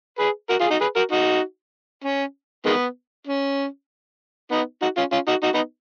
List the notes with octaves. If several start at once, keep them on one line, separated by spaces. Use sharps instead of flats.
G#4 B4
F#4 A#4
F4 G#4
D#4 F#4
G#4 B4
F#4 A#4
D#4 F#4
C#4
D#3 G#3 B3
C#4
B3 D#4
D#4 F#4
C#4 F4
C#4 F4
D#4 F#4
D#4 F#4
B3 D#4